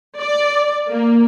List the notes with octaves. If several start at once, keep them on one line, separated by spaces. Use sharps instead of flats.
D5
A#3